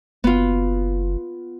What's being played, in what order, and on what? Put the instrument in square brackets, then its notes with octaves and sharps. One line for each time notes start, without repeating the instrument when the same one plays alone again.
[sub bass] F#1 [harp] B3 F4